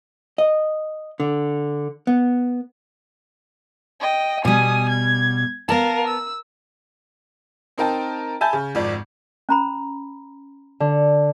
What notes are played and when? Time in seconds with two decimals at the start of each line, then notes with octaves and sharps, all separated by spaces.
0.38 D#5
1.20 D3
2.07 B3
4.01 D#5 G5
4.45 B2 G3 G#5 D#6
4.89 G#6
5.69 B3 A#4 F5 A5
6.07 E6
7.78 C4 D#4 A#4 G5 A5
8.41 E5 G#5 A5 B5 G6
8.53 C#3
8.75 G#1 F2 D5
9.49 C#4 A#5 B5
10.80 D3